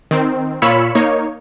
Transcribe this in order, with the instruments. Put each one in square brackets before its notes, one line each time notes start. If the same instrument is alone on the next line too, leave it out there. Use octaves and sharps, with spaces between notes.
[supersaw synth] D#3 C4
A#2 F4 C#5 B5 E6 C#7
A#3 D#4 C#5